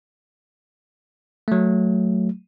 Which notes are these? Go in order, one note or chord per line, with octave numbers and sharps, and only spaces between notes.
F#3 A3